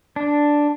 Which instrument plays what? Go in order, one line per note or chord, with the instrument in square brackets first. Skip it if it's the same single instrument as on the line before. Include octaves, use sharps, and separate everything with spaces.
[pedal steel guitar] D4